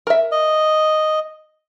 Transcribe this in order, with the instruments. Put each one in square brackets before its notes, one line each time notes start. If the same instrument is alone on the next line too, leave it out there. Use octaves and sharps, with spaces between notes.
[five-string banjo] A#4 E5
[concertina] D#5